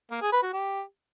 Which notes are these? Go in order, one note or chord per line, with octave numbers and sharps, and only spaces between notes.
A#3
G#4
B4
F#4
G4